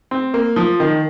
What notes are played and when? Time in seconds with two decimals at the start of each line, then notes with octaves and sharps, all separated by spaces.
0.11 C4
0.34 A#3
0.56 F3
0.80 D#3